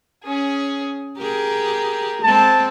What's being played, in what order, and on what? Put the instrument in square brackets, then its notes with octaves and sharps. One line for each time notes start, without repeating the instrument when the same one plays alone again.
[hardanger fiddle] C#4 G#4
[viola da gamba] G4 G#4 [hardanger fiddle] A#4
[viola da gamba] G#3 C4 [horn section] A5